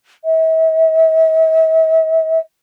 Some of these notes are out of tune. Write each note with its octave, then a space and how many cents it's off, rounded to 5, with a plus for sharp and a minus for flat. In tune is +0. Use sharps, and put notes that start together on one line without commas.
E5 -45